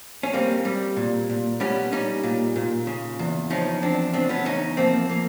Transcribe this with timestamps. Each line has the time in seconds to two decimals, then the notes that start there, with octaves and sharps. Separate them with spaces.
0.23 C#4
0.33 G3 A#3 C4
0.65 G3
0.96 A#2
1.29 A#2
1.60 G3 B3 C#4
1.92 G3 C#4 D#4
2.23 A#2
2.56 A#2
2.87 C#3
3.19 E2
3.50 F3 C#4 D#4
3.82 E2 C4 D4
4.13 C#3 C4 D4
4.29 B3 C#4
4.45 E2 C#4 D#4
4.77 F3 A#3 C4
5.09 A#3